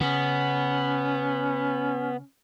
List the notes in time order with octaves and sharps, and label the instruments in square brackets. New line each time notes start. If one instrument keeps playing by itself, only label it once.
[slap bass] C#3 [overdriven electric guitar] B3 [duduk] C#4